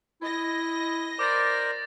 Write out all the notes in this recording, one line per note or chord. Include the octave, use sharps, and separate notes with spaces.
E4 D#5 A#6
A#4 C5 D5 D6 A6